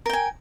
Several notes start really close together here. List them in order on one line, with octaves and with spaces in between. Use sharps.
A#4 G5 G#5